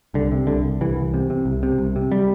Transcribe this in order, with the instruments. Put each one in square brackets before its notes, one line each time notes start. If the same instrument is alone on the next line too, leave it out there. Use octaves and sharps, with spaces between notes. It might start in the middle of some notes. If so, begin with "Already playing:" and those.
[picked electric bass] C2 D3
C3
C2 D3
C2
C2 E3
C2
C3
C3
C2
C3
C2
C3
G3